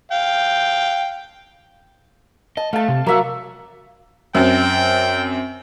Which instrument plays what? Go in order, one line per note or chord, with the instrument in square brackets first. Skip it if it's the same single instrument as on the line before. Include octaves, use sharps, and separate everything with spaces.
[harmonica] F5 G5
[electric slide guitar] D#5 [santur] A5
[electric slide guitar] A3 [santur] F5 A5
[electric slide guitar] C3
[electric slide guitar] F#3 F#4 [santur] A#3 E5
[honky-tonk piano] F#2 C4 [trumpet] G5